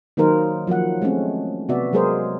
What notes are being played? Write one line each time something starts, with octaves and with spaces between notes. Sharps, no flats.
D#3 F#3 A#3 D#4 A#4 C5
F3 F#3 A#3 F#5
G#3 A3 C4 C#4
C3 B3 F#4 D5 E5
F#3 G#3 A#3 G#4 A#4 C5